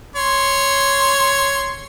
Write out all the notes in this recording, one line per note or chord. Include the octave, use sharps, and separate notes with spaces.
C#5 C6